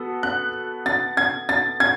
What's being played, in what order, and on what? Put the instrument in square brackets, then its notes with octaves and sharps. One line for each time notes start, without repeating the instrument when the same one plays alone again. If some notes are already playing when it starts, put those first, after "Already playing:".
Already playing: [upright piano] B3 F#4 A4
[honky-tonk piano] F#6
A6
G#6
A6
G#6